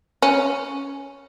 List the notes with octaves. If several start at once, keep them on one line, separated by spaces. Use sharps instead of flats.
C#4